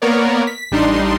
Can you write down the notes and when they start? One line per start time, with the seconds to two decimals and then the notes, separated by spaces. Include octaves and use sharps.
0.02 A#3 B3 A#4 C#5 D5
0.47 B6
0.72 A1 G3 D4 D#4 C6